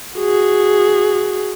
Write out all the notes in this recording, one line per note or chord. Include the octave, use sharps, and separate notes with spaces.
F#4 G#4